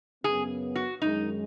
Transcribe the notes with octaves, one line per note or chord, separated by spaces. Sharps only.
F#2 C#3 B3 G#4
F#4
F#2 D#3 G#3 D#4